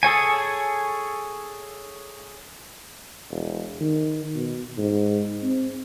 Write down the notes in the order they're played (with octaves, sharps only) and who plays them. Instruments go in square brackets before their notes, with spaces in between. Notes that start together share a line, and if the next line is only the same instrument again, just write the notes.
[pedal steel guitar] G#4 A4 C#5 G#5
[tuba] E1
D#3
B2
G#2
C4